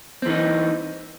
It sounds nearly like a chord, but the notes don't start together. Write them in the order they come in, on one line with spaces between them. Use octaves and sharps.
C4 E3 D#4